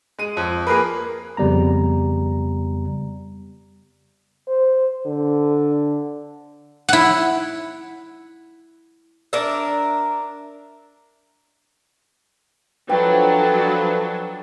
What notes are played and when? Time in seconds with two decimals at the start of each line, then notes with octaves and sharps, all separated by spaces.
0.19 G#3 D#7
0.37 F2
0.67 A#3 G#4 A#4 B4
1.37 F2 C#3 G3 B3 A#5
4.48 C5
5.06 D3
6.89 E4 F#5
9.33 D4 A#4 E5
12.89 F3 F#3 D4 A4 B4 G5